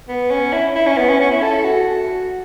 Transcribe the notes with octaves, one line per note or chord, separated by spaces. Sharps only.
B3
C#4
E4
E4
C#4
B3
C#4
C#4
E4
A4
F#4